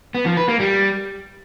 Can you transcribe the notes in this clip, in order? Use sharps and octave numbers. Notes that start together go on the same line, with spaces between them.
B3
F3
B4
A#3
G3